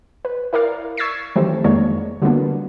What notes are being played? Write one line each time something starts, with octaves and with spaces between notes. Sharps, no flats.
B4
E4 A#4 D5 F5
C#6 E6 G#6 A6 B6 C7
D#3 E3 F#3 G3 A3 C4
F2 D#3 G#3 A#3 D4 C#5
D3 F#3 G3 A#3 B3 D4